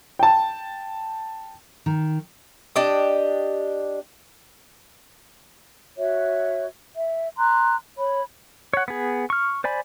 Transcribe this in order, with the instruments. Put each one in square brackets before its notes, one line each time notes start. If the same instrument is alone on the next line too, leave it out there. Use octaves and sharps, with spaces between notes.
[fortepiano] G5 A5
[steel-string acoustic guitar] D#3
[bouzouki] D4 G4 D#5
[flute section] F#4 C#5 E5
E5
A#5 C6 F#6
C#5 B5
[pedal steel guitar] C#5 F#5
B3 G#4
C#6 F6
C5 D5 G#5 B5